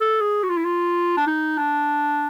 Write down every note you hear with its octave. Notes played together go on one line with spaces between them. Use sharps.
A4
G#4
F#4
F4
E4
F4
D4
D#4
D4